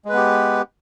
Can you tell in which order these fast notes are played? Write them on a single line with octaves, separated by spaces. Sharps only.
G#3 B4 B3 G4